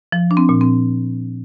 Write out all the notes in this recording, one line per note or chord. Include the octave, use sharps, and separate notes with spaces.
F3
D4
C4
A#2
C4